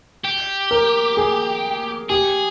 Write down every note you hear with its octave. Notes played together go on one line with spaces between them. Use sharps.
G4
A#4
G#4
G4 G#4